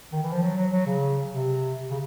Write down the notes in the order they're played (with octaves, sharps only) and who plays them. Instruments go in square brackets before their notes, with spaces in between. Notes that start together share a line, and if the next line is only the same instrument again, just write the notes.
[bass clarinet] D#3
E3
F3
F#3
F#3
F#3
C#3
C3
C#3